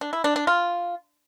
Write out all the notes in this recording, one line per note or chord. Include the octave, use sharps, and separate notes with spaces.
D4
E4
D4
D4
F4